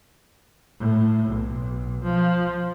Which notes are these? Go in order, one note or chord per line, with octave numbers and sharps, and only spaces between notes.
A2
B1
F3